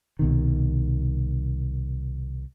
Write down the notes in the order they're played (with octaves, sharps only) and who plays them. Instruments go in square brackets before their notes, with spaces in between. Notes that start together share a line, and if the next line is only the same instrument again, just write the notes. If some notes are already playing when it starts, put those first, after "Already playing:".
[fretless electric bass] C2 B2 D#3